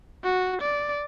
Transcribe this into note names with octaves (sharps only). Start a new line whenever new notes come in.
F#4
D5